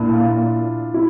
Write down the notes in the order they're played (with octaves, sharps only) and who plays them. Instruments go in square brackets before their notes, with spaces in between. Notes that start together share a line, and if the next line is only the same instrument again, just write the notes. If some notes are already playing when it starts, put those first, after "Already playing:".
Already playing: [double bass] A#2 [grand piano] D4 E4
[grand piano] F4
E4